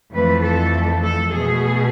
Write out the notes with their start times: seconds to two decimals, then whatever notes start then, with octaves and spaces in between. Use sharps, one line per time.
0.13 F2 E3 A3 B4
0.43 A4
1.03 A4
1.34 B2 A3 G#4